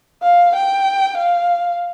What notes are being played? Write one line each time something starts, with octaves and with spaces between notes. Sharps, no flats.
F5
G5
F5